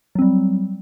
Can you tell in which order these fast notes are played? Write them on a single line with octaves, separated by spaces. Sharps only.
F#3 C4 G3